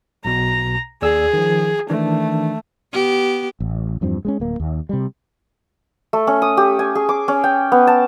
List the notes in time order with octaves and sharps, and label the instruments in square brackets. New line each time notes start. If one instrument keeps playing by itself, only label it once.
[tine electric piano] B1 B2 [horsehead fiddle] A#5
[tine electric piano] D#2 D5 E6 [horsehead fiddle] G#4
[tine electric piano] D#3 F3
[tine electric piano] D#3 E3 D4 [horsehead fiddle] A3
[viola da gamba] B3 G4
[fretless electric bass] A1
E2 G2 F3 C4
G#3 C4 C#4
D1 A#3
D#2
C3 G3
[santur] A3
C#4
D#6
G4
G#5
G#4
D6
C#4
G5
B3
A5